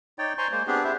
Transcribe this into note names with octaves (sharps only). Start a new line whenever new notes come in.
D#4 C#5 D5 G5
C5 G#5 A#5 C6 C#6
G#3 A#3 C5
B3 C4 D4 G4 G#4
E4 G4 C5 E5